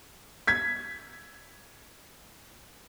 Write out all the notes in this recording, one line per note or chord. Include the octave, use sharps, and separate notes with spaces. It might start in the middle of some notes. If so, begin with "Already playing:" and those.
G#6 B6